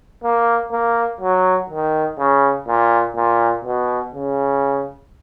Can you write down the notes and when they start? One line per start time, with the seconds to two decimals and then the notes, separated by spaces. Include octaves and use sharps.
0.24 A#3
0.72 A#3
1.21 F#3
1.70 D#3
2.18 C#3
2.67 A#2
3.16 A#2
3.65 B2
4.14 C#3